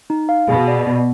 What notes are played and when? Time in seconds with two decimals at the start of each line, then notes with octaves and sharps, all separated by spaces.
0.10 D#4
0.29 F5
0.48 B2 G#4
0.68 D5
0.87 B3